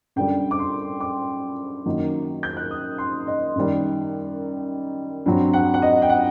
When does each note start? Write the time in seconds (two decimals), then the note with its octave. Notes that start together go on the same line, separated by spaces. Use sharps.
0.16 F#2 D3 G3 G5
0.51 D6
0.59 C6
1.00 D6
1.86 F#2 D#3 F#3 A#3 D#4
2.43 G6
2.57 F#6
2.71 D#6
2.98 C6
3.27 D#5
3.56 F#2 D#3 G3
5.26 G2 F#3 C4
5.53 F#5
5.74 F#5
5.82 D#5
6.02 G5
6.10 F#5